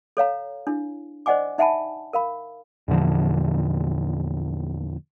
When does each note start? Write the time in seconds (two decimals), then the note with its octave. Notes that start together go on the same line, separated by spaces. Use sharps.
0.17 A4 C#5 F5 A#5
0.67 D4 E4
1.26 C5 D5 D#5 F#5 G#5 D6
1.58 D#4 E5 F#5 G#5 A5 B5
2.13 A#4 F5 B5
2.88 E2 A#2 D3 F3